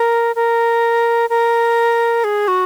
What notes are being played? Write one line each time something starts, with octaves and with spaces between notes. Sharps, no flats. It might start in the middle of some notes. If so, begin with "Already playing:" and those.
Already playing: A#4
A#4
A#4
G#4
F#4